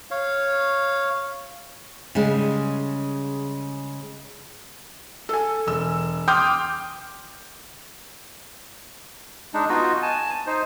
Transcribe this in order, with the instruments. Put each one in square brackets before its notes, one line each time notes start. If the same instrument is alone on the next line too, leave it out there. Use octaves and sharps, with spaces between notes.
[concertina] C#5 F5
[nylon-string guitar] C#3 G3 G#3
[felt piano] A4 G#5
E1 E6
G5 C6 D6 D#6 F6 G6
[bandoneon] G#3 D4 D#4
B3 D#4 F4 F#4
G#5 A5
D#4 C5